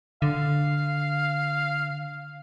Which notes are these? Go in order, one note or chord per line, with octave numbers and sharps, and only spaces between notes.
D3 F5